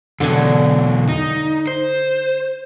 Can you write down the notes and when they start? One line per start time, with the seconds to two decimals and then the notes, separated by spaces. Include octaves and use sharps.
0.20 E2 B2 D3 F#3 D5 G#5
1.09 D#4
1.67 C5